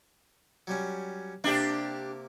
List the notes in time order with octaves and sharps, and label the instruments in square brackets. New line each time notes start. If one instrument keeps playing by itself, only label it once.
[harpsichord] F#3 G3 C#4
[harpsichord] C3 A#3 [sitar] D4 G4